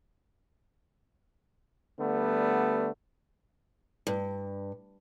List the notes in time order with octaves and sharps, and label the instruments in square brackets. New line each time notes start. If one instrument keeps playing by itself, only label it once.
[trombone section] D3 G3 A3 B3
[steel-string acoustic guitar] G2